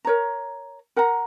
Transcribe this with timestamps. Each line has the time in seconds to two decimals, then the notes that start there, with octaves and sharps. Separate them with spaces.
0.05 A#4 C#5 A#5
0.96 A#4 F#5 A#5